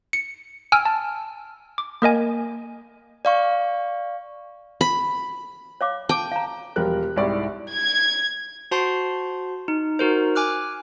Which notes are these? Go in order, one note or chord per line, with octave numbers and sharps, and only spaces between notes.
C#7
G#5 E6 F6 D7
A5
D6
A#3 A#4 D#5 G#5
D5 F5 C#6
B5
C#5 F5 D6
G5 A5 D6
F5 A#5
E1 F3 G3 A#4 F#6
C2 G#2 E4 D5 C#6
G#6
F#4 C5 A5 C6 C7
D#4
D#4 F#4 A#4 C5
G#5 D6 F6 F#6